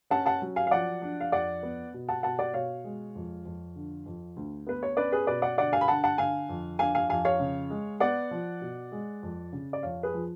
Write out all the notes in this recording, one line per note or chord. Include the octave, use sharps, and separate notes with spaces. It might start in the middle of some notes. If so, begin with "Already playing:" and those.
C#4 F#5 A5
F#5 A5
F#3
F5 G#5
F5
F3 D5 F#5
D4
F5
F2 D5 F#5
B3
B2
F#5 A5
B2 F#5 A5
D5 F#5
B2 C#5 F5
G#3
F2
F2
D3
F2
D2
B3 B4
C#5
C#4 B4 D5
G#4 B4
B2 B4 D5
D5 F#5
D3 D5 F#5
F5 G#5
B5
D3 F#5 A5
F#5 A5
D3 F5 G#5
F2
D4 F5 G#5
F5 G#5
F2 F5 G#5
C#5 F5
C#3
G#3
B3 D5 F#5
F3
B2
G#3
F2
C#3
D5
F2 C#5 F5
G#4 B4
F3